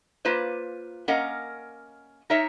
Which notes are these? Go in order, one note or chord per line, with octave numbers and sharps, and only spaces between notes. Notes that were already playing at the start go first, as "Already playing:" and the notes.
A#3 F4 B4 C5
A#3 C#4 A#4 D#5 F5 F#5
D#4 A#4 C#5 E5